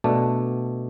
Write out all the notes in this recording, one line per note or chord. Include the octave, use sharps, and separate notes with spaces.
B2 A3 D4